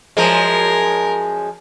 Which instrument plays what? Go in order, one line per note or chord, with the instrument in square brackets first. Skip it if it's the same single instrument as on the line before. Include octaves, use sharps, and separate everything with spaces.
[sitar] F#2 F3 G#3 [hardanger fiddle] A#4